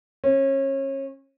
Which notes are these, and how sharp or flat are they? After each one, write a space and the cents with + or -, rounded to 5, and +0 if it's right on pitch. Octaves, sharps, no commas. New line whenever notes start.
C#4 -30